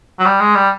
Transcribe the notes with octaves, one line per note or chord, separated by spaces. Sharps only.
F#3
G3
G#3
G3